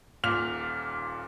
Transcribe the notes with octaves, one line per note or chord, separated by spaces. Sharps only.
D#1 A#2 F6 F7